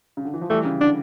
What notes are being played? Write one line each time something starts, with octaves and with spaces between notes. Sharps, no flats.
C#3
D3
E3
F3
E3 G3 A3
C#3
D3 D4